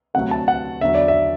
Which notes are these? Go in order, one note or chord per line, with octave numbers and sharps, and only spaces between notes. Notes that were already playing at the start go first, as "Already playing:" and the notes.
D2 C3 F#3 A3 F#5
A5
F#5
E2 D3 F#3 E5
D5
E5